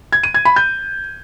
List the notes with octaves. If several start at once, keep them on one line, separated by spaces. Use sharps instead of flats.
G#6
D#7
G#6
B5
G6